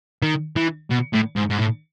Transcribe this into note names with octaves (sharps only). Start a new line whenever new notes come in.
D#3
E3
B2
A2
G#2
G#2
A2